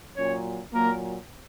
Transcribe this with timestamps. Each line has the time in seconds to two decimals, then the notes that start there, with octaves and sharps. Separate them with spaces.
0.17 A#2 F#3 C#4 C#5
0.73 A#2 F#3 A#3 A#4